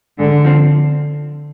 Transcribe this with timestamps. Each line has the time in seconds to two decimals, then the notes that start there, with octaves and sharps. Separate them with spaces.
0.19 G#2 D3
0.44 F3 C4